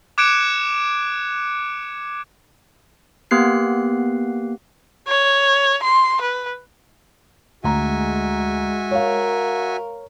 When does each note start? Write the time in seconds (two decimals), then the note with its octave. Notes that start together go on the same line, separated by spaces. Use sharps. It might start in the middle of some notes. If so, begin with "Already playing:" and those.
0.18 D6 F#6 G#6 C#7 D7 E7
3.31 A#3 B3 G4 F#6 C7
5.08 C#5
5.83 C6
6.22 B4
7.64 D2 G#3 F#4 E5 G#5 A#5
8.91 A#4 C#5 F5